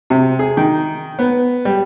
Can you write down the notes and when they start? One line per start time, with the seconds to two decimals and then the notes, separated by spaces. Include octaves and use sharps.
0.10 C3
0.39 G#4
0.57 D#3
1.19 B3
1.65 G3